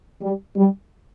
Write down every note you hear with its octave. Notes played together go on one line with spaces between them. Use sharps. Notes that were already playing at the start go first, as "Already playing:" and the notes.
G3
G3